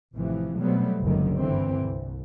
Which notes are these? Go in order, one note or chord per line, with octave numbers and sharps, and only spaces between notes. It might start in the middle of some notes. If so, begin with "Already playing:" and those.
A1 C3 E3 F3
B2 F#3 G3 A3 B3 C4
F#1 C#2 F#2 D3 D#3
G2 D3 E3 C4
C2